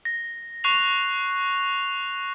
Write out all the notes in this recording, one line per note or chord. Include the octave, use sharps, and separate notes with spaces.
A#6
C#6 F#6 C7 F7